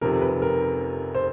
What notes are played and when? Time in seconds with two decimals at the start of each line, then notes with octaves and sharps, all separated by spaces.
0.01 F1 F2 C3 D#3 A#4
0.21 B4
0.42 A#4
1.15 C5